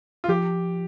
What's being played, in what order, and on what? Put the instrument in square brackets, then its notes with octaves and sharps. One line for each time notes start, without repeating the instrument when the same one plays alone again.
[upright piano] F4
[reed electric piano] F3 [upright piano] G4